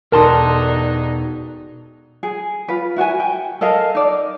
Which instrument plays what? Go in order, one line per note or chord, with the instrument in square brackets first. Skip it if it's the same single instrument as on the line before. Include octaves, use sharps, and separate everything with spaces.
[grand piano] E1 A4 [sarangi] D4 [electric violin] D#4 [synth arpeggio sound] A#4 A5 C6
[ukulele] G#4
F4 B4
E4 F#4 A#4 G#5
G5
A4 A#4 D#5 F5
D#4 D5